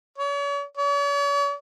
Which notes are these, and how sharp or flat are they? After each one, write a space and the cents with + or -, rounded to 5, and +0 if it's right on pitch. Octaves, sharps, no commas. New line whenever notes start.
C#5 +40
C#5 +45